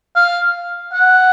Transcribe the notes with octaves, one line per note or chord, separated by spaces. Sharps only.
F5
F#5